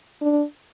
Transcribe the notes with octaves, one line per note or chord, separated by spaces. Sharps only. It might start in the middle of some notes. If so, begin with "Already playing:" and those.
D4